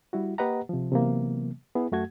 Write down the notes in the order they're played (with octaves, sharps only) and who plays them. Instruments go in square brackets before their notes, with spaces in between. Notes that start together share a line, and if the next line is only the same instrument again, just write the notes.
[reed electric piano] G3 E4 F#4
A#3 G4 B4 D#5 F#5 A#5
C3 F3
C3 E3 F#3 A#3 B3
B3 E4 G#4
F#2 A3 F#4 G#6